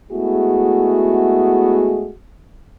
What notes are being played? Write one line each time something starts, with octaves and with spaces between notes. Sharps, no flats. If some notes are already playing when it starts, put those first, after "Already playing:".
G#3 A3 B3 E4 F#4 G#4